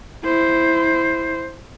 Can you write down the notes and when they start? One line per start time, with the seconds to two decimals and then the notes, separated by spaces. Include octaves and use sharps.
0.24 E4 C5